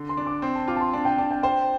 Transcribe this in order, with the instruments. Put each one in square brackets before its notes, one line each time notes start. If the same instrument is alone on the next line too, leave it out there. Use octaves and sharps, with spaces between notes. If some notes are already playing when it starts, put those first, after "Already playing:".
Already playing: [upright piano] D3
[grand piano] C6
[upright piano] D4
[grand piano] D6
[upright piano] C4 [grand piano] C6
[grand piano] A5
[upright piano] F4 [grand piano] D6
[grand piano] A5
C6
[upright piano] D4 [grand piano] A5
[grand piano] G5
[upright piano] D4 [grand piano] A5
[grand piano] G5
[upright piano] C5 [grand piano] G5